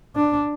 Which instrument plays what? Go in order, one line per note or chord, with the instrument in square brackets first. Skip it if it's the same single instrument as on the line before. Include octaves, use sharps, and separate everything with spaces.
[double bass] D4